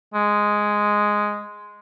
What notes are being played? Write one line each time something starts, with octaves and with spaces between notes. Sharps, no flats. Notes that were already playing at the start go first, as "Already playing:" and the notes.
G#3